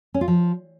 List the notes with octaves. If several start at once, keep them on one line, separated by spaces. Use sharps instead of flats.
C#4
F4
F3